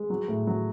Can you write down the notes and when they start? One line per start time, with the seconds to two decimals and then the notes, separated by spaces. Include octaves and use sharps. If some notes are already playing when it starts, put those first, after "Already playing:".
Already playing: G#3
0.10 F#3
0.28 A2
0.47 F#3